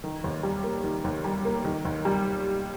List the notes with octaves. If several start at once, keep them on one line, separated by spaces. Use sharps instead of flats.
D#3
D#2
G3
A#3
D#3
D#2
G3
A#3
D#3
D#2
G3